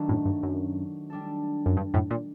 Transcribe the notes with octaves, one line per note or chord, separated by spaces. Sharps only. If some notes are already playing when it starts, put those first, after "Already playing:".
Already playing: D#3 F#3 A3 D4
F#2 A2
G2
F#2
G3 D4 A4
F#2
G2
F#2 A2
A#2